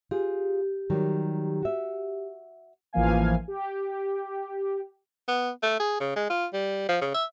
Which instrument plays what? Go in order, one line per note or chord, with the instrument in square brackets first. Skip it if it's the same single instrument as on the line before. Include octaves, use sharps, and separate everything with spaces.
[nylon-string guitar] F4 G#4 [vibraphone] G4
[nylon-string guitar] D#3 F#3 G3
F#4 E5
[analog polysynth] A1 E3 F3 A#3 F5 G#5
G4
[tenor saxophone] B3
A3
G#4
C#3
G#3
F4
G3
F3
C#3
E5